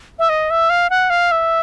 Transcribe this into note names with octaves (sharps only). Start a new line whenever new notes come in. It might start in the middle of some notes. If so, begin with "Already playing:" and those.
E5
D#5
E5
F5
F#5
F5
E5